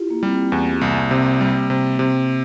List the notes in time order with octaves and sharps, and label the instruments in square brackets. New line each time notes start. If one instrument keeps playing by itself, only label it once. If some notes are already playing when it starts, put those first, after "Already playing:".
Already playing: [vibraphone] E4 F4 G4
A#3
[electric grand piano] G3 [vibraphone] C4
[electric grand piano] E2 [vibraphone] A#3
[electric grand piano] C2 [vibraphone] A#3
[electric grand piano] C3
G3
C3
C3